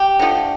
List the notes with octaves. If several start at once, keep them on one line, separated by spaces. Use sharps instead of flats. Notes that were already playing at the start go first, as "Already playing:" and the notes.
Already playing: G4
D3 F3 A3